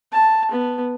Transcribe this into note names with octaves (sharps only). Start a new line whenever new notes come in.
A5
B3